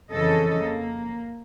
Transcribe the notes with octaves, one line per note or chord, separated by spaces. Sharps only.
F2 C#3 E3 A4 D#5
A#3